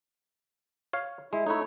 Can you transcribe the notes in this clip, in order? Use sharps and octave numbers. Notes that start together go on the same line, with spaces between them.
C#5 F5
G#3 E4
A3 D#4 E4 C#5